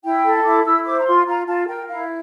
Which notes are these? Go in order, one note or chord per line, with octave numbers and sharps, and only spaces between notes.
E4 G5
A4
E4 D6
E4 E6
C5 D6
A#5
F4 C6
F4 A#5
F4 A5
A#4 G5
E4 F5